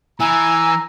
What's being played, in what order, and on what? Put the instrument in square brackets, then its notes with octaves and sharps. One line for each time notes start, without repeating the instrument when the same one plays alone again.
[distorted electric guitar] E3 [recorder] G#5 [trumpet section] A#5 [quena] E6